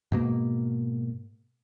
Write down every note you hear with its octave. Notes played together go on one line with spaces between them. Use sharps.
G#2 B2 A#3